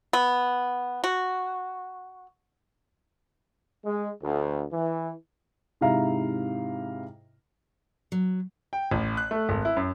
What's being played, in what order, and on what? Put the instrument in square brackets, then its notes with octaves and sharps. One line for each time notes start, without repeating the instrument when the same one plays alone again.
[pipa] B3
F#4
[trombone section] G#3
D2
E3
[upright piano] G#2 C3 E4 E5 F5 A#5
[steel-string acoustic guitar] F#3
[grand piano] G5
A1
F#6
A3
G#1
E4
F#2